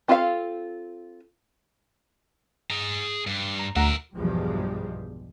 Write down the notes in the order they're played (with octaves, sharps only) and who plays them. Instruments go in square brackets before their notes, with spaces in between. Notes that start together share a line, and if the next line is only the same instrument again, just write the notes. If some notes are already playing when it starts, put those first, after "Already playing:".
[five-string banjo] C4 F4 A4 C5 F5
[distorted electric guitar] G#4 A#5
G2
[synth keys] A#5
[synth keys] D2 F#5 A#5 [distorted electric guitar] A#4 E5
[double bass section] B1 E2 G2 F3 G3 G#3